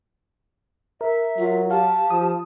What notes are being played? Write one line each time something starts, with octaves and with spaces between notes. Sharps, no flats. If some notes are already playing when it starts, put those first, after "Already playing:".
A#4 E5
F#3 F4
G4 F5 A5
F3 D#6